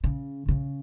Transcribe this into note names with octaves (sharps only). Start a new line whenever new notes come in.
C#3
C#3